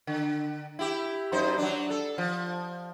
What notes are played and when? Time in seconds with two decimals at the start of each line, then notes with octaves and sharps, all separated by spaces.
0.07 D3
0.79 E4 G4
1.32 F#2 D#4 C5
1.58 F#3 D4
1.90 A4
2.18 F3